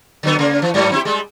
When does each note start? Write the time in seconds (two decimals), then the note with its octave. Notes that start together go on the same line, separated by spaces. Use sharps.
0.23 D3 F#3 B3
0.39 C#3 A#3
0.62 E3
0.74 G2 F#3 A3
0.92 C4 E4 G4
1.05 G3 G#3